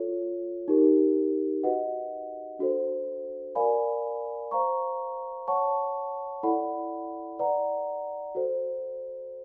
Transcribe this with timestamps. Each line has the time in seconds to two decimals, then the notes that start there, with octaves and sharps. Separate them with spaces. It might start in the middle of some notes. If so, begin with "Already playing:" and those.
Already playing: F4 A4 C#5
0.68 D#4 G4 A#4
1.63 F#4 B4 D#5 F#5
2.59 D4 F#4 A4 C5
3.55 A#4 D5 F5 G#5 B5
4.51 C5 F5 A#5 C#6
5.48 C#5 F#5 A5 C#6
6.43 E4 A4 D5 F#5 B5
7.39 B4 D5 F#5 A#5
8.35 F#4 A4 C5